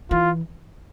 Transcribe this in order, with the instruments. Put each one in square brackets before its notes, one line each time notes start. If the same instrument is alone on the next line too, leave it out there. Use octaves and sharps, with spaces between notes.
[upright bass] E3 [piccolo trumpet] F4